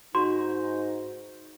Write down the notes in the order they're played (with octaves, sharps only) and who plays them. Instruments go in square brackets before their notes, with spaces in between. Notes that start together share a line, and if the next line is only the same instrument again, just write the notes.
[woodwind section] G#2 D#4 [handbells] F#4 [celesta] C6